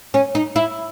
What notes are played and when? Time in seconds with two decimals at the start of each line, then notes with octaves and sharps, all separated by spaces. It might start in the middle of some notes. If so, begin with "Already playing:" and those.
0.14 C#4
0.35 D#4
0.56 E4